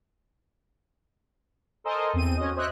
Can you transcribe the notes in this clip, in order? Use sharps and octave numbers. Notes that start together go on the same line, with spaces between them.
A4 A#4 C5 D#5 G#5
E2 C4 D#7
C#4 F#4 D#5
C5 C#5 D#5 E5 G5 F#6